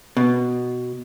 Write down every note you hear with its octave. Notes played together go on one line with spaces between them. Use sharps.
B2